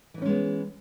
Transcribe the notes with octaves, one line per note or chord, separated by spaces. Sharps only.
E3 G#3 B3 C#4 D#4